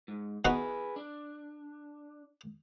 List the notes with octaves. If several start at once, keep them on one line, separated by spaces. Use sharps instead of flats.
G#2
B3 D#4 F#4 G#4 B4
D4